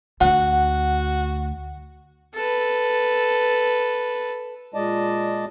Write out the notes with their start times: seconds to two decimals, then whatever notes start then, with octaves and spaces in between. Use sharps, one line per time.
0.21 D2 F#4 F#5
2.35 A4 B4
4.74 A#2 G#3 D5 D#5 A5